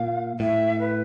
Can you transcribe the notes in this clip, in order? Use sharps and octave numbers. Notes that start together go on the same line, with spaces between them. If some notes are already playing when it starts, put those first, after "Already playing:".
Already playing: A#2 F5
A2 E5
B4